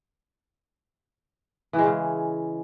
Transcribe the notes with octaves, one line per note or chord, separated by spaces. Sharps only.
E3
G#3
C#3